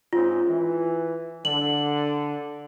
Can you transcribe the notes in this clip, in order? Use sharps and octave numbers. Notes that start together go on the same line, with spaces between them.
G#2 C4 C#4 F4
E3
D3 F#7